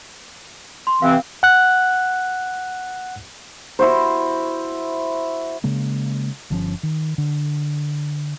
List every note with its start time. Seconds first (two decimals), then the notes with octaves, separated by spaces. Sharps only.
0.87 C6
1.02 C3 E3 C4 F5
1.43 F#5 F#6
3.79 E4 F#4 C5
5.64 C#3 G#3 A#3
6.50 G1 F3 C#4
6.83 D#3
7.18 D3